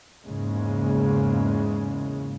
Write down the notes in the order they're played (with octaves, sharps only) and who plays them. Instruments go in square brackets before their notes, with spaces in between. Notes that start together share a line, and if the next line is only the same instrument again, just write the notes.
[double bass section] E2 G#2 C#3 G#3 A#3